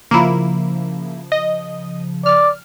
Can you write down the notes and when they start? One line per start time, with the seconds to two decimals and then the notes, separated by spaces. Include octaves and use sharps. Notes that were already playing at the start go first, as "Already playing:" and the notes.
0.11 C#3 F3 A#3 E4
1.32 D#5
2.26 D5 F6